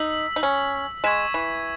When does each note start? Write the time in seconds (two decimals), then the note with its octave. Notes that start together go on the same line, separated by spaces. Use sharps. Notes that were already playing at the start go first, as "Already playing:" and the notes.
Already playing: D#4 E6 B6 F#7
0.36 D#4
0.43 C#4
1.04 G#3 C#6 G#6 B6 E7
1.34 E3